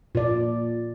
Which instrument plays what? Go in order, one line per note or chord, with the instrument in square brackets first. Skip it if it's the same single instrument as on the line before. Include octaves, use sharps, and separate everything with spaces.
[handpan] A#2 D5